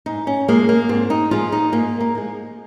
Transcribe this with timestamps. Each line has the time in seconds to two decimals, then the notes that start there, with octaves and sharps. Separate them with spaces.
0.06 G#2 D#4
0.27 C#4
0.48 F3 G#3 A#3
0.69 A#3
0.89 G#2 C4
1.10 D#4
1.31 F3 G#3 F4
1.52 D#4
1.72 G#2 A#3
2.00 A#3
2.15 F3 G#3